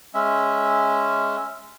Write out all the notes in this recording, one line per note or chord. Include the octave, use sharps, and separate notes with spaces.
G#3 C#4 E5